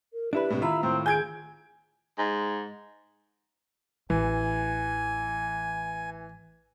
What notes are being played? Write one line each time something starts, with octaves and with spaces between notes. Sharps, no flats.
A#4
D4 E4 G4 B4
A2 C3
D#3 E4 F4 E5 A#5
A2 C4
G#4 G#5 G6 G#6 D7
G#2
A1 E3 G#5